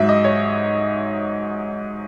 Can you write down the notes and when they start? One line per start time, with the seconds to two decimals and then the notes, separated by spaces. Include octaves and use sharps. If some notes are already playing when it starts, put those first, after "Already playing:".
Already playing: G#2 F#3 E5
0.09 D#5
0.24 C#5